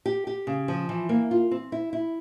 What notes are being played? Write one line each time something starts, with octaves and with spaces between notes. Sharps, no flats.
G4
G4
C#3
F3
E3
A#3
F4
C4
E4
E4